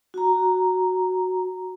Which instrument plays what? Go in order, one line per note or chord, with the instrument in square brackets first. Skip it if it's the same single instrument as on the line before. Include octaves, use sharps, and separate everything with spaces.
[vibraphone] F#4 A#5